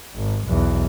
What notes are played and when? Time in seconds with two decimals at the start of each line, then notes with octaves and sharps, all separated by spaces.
0.16 G#1
0.48 B1 E2